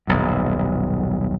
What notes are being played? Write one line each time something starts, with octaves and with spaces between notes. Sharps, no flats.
D#1 B1 F#2